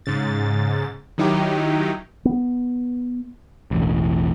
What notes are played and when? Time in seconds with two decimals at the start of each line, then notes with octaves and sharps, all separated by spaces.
0.06 G#2 C#3 A6
1.18 D#3 F#3 D#4 E4 G4
2.25 B3
3.71 E1 A1